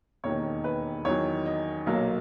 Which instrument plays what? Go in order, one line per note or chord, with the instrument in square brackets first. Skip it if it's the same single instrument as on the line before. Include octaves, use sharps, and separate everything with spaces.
[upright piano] E1 D#2 D#3 C#5
B4
E2 D#3 F#3 C#5
D#5
B1 A#2 F#3 A#3